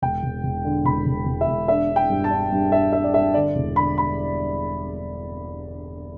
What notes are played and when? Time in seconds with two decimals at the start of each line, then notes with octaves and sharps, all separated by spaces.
0.02 E1 G5
0.23 E1
0.44 E1
0.65 D3
0.85 E1 B5
1.07 E1
1.26 E1
1.41 E5
1.48 E1
1.68 D4 E5
1.90 D4
1.96 G5
2.10 G2
2.24 A5
2.30 D4
2.52 G2
2.72 D4 E5
2.93 D4 E5
3.04 D5
3.14 G2 E5
3.34 D3 D5
3.56 E1
3.76 D3 B5
3.98 B5